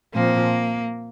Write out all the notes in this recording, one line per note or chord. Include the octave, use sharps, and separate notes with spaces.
A#2 F3 A#3 C4